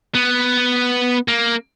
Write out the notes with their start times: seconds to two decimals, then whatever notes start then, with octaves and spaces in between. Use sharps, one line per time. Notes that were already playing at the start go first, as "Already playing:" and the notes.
0.15 B3
1.28 A#3